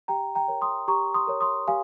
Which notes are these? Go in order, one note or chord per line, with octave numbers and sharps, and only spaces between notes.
G4 G5 A#5
G5 A#5
A#4 C#5
C6 D#6
G4 A#5 C#6
C6 D#6
A#4 C#5
C6 D#6
G4 F5 G#5